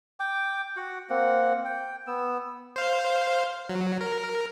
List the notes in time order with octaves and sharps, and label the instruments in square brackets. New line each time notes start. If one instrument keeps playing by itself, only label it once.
[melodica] G5 D6
F#4 F#5
A#3 C4 F#5
G5
B3 E6
[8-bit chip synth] C5 F5
F#3
A#4